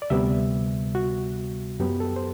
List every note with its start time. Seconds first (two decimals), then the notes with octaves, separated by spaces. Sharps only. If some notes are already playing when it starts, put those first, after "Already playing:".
0.02 D5
0.10 D2 C3 G3 B3 E5
0.95 F#4
1.80 F#2 F#3 B3 G4
2.00 A4
2.16 C5